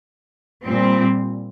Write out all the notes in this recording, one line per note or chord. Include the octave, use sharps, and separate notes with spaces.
A#2 G3 C4